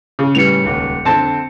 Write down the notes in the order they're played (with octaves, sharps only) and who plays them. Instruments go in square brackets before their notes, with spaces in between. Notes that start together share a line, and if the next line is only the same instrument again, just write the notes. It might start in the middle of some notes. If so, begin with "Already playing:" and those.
[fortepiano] C#3
[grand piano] A2 E3 G3 [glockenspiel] C#7 F7
[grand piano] D#1 C#2
[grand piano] F2 D3 C5 [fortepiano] C4 A5